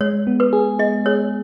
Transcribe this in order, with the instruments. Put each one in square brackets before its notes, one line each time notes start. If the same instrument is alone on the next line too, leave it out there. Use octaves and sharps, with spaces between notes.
[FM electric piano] G#3 [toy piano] C#5
[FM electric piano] B3
[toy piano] B4
[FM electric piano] G#4
[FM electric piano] G#4 [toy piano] D#5
[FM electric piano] G#4 [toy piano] C#5